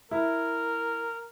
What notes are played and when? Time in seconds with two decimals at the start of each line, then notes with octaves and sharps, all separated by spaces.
0.11 E4 A#4